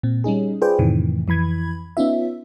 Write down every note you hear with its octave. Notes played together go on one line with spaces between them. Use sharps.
A#2 C4
G3 C#4 D#4 G#4
F4 G#4 B4 C5 D5 G5
F2 A2 C3 D#3 E3
F2 E3 B5 G#6
B3 C#4 D#4 F4 E5